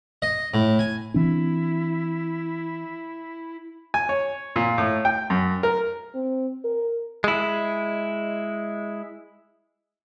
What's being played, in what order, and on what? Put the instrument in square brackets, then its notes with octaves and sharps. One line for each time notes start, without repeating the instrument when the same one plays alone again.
[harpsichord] D#5
A2
G#5
[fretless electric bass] E3 C4 D4 [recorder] E4
[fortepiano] G#5
C#5
A#2
A2
G5
F#2
A#4
[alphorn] C4
A#4
[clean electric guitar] G#3 E4